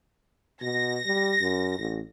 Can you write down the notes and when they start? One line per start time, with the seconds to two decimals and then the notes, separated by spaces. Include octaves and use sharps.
0.61 B2 A#6
1.06 G3
1.41 F#2
1.79 A1